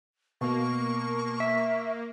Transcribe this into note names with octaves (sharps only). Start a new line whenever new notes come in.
B2 A#3 C#6
E5